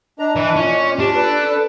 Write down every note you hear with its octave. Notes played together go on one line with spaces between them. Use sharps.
D4 D#5 A#5
E3 D4 E4
A#2 C#4
D4 G4
A4 B4 D5